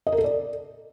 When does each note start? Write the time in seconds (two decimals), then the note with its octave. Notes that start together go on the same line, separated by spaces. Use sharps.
0.07 D#5
0.12 A#4
0.18 A4
0.24 D5